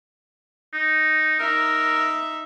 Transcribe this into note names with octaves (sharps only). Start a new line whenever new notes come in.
D#4
D#4 A#4 E5